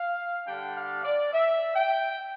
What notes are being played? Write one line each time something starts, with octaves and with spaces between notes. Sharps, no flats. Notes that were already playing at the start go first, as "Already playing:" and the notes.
Already playing: F5
D3 G3 D4 G5
F5
D5
E5
G5